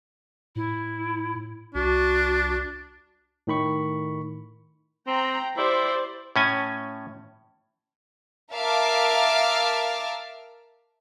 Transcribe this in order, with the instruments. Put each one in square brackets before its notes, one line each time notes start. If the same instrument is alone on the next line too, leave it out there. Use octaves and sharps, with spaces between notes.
[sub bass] A2 [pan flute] E4
[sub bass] C2 [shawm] D4 [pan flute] F#4
[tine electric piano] A2 D#3 B5 C#6
[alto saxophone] C4 [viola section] G5 A#5
[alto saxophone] E4 [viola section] G4 C5 D5
[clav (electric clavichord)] A2 C#4 G#5
[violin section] A#4 E5 F5 A5 D6